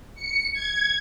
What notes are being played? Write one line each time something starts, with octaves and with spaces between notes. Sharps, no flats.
C#7
G#6